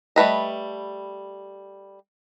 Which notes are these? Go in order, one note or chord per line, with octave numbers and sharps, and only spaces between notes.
G3 A3 B4 D#5